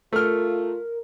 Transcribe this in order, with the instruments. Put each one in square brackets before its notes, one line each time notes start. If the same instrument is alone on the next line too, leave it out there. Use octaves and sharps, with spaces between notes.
[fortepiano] A3 F6 [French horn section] F4 [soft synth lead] A#4